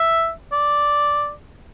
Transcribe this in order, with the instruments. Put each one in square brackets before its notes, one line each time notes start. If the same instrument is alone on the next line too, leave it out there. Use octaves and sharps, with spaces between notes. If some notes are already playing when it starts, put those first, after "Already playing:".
Already playing: [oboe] E5
D5